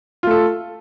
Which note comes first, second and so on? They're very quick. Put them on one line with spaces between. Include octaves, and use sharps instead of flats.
F4 A3 A4